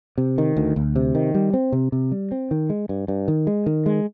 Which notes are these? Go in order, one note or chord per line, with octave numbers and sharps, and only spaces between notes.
C3
D#3
D2
D2
C3
D#3
G3
C4
C3
C3
G3
C4
D#3
G#3
G2
G2
D#3
G#3
D#3
G#3